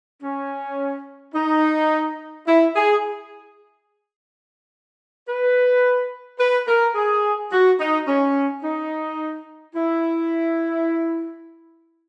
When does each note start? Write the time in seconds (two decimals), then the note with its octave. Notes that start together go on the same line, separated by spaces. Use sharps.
0.23 C#4
1.34 D#4
2.47 E4
2.75 G#4
5.27 B4
6.39 B4
6.67 A#4
6.95 G#4
7.52 F#4
7.79 D#4
8.07 C#4
8.63 D#4
9.75 E4